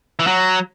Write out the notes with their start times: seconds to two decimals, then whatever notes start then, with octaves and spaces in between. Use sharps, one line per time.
0.19 E3
0.27 F#3